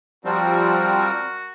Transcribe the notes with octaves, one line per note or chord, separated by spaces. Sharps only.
F3 G3 C4 F#4 A#4